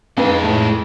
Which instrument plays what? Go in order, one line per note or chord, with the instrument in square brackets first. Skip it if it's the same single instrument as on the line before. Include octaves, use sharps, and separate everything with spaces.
[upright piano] F2 [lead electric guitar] G#3 A4 [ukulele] D#4 B4 F5
[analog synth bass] A2